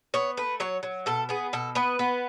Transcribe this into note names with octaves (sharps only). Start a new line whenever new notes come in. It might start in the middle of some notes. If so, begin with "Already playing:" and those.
B3 C#5
A3 B4
F#3 C#5
F#3
B2 A4
B3 G#4
B2 A4
B3 B4
B3